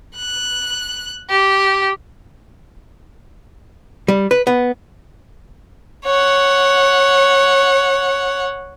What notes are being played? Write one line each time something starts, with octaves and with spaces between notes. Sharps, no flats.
F#6
G4
G3
B4
B3
C#5 F#5